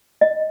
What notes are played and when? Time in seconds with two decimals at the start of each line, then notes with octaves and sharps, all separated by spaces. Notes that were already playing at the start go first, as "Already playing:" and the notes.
0.21 D#5